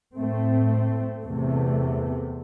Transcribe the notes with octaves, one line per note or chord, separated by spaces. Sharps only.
A2 A3 C4
E2 C3 A3